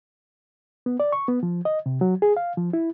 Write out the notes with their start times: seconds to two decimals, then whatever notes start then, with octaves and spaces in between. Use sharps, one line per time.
0.86 B3
1.00 D5
1.12 C#6
1.28 B3
1.43 F3
1.65 D#5
1.86 C3
2.01 F#3
2.22 G#4
2.37 F5
2.57 F3
2.73 E4